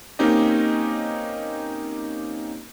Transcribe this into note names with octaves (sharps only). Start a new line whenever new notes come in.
A#3 C4 C#4 D#4 G4 D#5